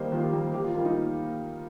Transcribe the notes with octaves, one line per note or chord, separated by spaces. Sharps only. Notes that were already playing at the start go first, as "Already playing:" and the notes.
Already playing: D#3 G3 A#3 C5 D#5
D#3 F4
G4
G3 A#3 A#4
D#3 G4
F4
G3 A#3 F4
D#4